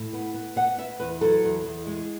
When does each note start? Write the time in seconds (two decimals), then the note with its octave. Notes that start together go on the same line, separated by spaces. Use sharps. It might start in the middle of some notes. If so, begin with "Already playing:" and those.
Already playing: A2
0.13 B3
0.34 B3
0.56 B3 F#5
0.78 B3 E5
1.00 E2 B4
1.21 F#3 A4
1.44 E2
1.65 E2
1.87 G#3